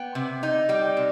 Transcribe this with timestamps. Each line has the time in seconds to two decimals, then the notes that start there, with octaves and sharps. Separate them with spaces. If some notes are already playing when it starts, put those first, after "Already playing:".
Already playing: B3 G5
0.15 C3
0.43 D#4
0.69 G3 G5
0.97 C3